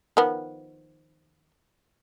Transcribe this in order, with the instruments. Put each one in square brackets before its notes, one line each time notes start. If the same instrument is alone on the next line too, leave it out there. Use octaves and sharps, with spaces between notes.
[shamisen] D#3 F3 B3